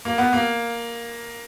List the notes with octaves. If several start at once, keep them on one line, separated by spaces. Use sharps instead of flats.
A#3
B3
A#3